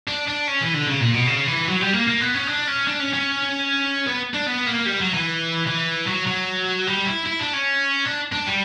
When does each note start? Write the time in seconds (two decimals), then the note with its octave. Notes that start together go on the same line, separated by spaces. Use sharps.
0.08 D4
0.27 D4
0.47 C#4
0.61 E3
0.74 D3
0.88 C#3
1.00 A#2
1.14 B2
1.27 C#3
1.47 E3
1.68 F#3
1.81 G3
1.93 A#3
2.08 A#3
2.21 B3
2.34 C#4
2.47 D4
2.67 C#4
2.88 D4
3.00 C#4
3.14 C#4
4.07 B3
4.34 D4
4.47 B3
4.67 A#3
4.86 G3
5.00 F#3
5.14 E3
5.66 E3
6.06 F#3
6.26 F#3
6.87 G3
7.06 E4
7.26 E4
7.39 D4
7.53 C#4
8.06 D4
8.33 D4
8.47 G3